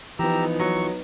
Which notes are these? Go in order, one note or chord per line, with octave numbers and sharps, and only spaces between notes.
E3 F3 B3 D#4 G4 A#5 E6
F#3 C#6